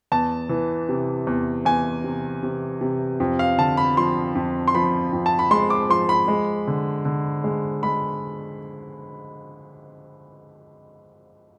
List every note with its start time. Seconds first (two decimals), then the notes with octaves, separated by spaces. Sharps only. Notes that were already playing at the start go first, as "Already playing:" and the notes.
0.12 E2 A5
0.49 E3
0.89 C3
1.27 E2
1.65 E2 G#5
2.04 C3
2.43 C3
2.81 C3
3.20 F2
3.39 F5
3.58 D3 A5
3.77 B5
3.97 F3 C6
4.35 F2
4.68 C6
4.75 F3 B5
5.13 F2
5.26 A5
5.39 B5
5.51 G#3 C6
5.70 D6
5.90 F3 C6
6.09 B5
6.28 G#3
6.67 D3
7.05 D3
7.44 G#3
7.83 G#3 B5